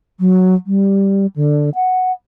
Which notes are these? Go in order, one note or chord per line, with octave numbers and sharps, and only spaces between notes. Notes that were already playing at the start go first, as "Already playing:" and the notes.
F#3
G3
D3
F#5